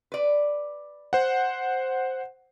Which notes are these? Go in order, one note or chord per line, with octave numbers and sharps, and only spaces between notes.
B4 D5
C5 F#5